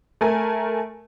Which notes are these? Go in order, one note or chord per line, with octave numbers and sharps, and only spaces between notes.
A3 A#4 G#5